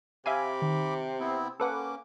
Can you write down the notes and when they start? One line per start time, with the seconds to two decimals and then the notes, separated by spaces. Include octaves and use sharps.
0.26 C3 E5 F5 G#5 B5 D6
0.62 D#3
1.20 B3 C4 E4
1.60 A#3 C#4 A4 B4 F#5 D6